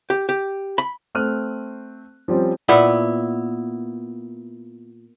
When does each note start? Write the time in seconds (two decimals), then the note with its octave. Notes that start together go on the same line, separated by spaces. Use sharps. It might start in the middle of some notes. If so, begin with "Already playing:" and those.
0.10 G4
0.29 G4
0.78 B5
1.15 A3 C4 F6 F#6 D#7
2.28 F3 G3 C4 C#4
2.68 A#2 B3 E4